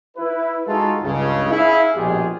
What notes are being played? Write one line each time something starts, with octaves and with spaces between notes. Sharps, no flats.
E4 B4
G#3 D#4 F4 F#4 G#4 A4
C#2 G2 C#3
E4 G#4 F5
A#1 G#2 B2 F4 G4 G#4